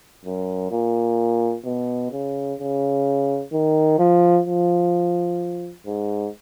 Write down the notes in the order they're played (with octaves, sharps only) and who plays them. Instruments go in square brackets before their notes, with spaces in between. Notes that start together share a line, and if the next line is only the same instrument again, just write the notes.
[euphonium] F#2
A#2
B2
C#3
C#3
D#3
F3
F3
G#2